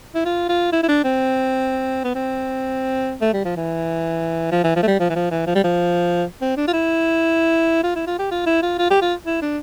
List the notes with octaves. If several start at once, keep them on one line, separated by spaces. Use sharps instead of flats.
E4
F4
F4
E4
E4
D4
C4
B3
C4
A3
G3
F3
E3
F3
E3
F3
A3
G3
F3
E3
F3
E3
F3
G3
F3
C4
D4
F4
E4
F4
E4
F4
G4
F4
E4
F4
F4
G4
F4
E4
D4